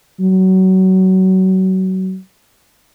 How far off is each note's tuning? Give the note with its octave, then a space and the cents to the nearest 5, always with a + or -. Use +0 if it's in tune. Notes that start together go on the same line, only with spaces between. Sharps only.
F#3 +25